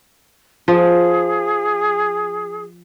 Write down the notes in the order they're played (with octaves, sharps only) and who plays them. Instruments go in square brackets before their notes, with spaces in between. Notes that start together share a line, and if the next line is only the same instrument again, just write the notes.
[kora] F3 [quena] G#4